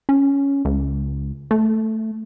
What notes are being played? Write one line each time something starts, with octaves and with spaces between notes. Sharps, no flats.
C#4
C#2
A3